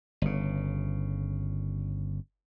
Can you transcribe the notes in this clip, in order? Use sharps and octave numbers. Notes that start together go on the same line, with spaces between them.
G1 C#3